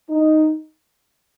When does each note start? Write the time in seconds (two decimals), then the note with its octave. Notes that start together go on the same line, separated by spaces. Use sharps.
0.10 D#4